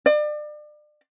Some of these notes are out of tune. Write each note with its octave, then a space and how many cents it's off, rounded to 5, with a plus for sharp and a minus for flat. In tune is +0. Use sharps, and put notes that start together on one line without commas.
D5 +35